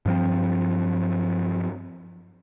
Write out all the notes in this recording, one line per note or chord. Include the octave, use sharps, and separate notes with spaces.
G2 F3 C4